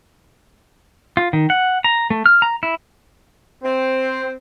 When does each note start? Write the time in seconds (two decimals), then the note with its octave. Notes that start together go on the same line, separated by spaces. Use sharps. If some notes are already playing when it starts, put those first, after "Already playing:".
1.17 F4
1.33 D#3
1.50 F#5
1.84 A#5
2.10 A3
2.26 F6
2.42 A#5
2.63 E4
3.63 C4